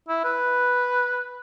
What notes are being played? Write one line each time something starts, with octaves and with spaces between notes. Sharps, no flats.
E4
B4